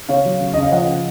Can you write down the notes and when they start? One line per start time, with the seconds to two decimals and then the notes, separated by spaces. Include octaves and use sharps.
0.09 C#3 C#5 F5
0.25 F#3
0.40 C#3
0.54 C#3 D#5
0.63 F5
0.71 F3 D#5 F#5
0.88 C#3